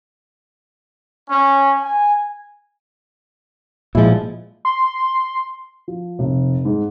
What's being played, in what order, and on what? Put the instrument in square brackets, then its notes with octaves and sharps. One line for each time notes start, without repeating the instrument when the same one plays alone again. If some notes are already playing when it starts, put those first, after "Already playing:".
[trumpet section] C#4
G#5
[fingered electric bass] A#2 F3 [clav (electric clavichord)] G#3 E4
[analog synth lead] C6
[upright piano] F3
F1
G#2